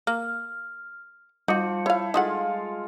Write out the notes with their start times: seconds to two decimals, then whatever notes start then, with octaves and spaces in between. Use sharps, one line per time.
0.07 A#3 F6
1.48 F3 G3 D#4 F#4 C#7
1.86 E4 C#5 F5
2.14 G#3 D#4 F4 A4 F5 F#5